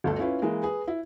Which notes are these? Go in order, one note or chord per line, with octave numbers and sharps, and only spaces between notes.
G1 D2 A4
C#4 E4 F4 B4
E3 G#3 A#3
G#4 B4
E4